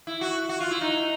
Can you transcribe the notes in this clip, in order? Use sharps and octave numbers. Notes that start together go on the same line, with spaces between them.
E4
F#4
F#4
F4
E4
D#4